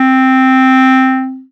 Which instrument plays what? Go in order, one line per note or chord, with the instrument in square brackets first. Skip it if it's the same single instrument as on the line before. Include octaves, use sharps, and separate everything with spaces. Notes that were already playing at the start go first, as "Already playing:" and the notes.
Already playing: [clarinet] C4